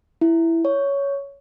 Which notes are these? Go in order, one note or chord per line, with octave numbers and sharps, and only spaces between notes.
E4
C#5